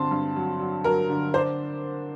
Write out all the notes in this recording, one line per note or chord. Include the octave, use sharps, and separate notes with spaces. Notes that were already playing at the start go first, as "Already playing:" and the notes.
Already playing: G2 D3 C4 A5 C6
G2
F#3
F#3
F#3 A#4
D3
D4 C5